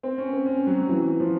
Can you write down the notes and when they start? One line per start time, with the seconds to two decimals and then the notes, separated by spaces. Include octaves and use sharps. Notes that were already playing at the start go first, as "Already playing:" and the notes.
0.03 C4
0.18 C#4
0.33 C4
0.46 C#4
0.67 F#3
0.78 F#3
0.89 E3
1.20 F3